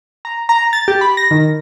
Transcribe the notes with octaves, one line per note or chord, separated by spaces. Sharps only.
A#5
A#5
A6
G4
B5
A#6
D#3